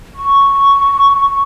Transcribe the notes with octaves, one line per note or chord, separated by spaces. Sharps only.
C#6